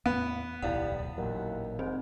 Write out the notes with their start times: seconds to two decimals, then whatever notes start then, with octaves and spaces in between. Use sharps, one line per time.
0.06 E2 A2 B3
0.62 D1 B1 E2 G3 E4 F5 F#5
1.18 A1 D#2 A#2 F#3
1.79 F1 G#2 D#3 C4